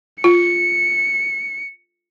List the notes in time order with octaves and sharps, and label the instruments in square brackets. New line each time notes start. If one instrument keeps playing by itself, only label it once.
[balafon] F4 [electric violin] C#7